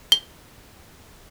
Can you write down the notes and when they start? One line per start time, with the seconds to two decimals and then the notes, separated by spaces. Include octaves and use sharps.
0.12 G7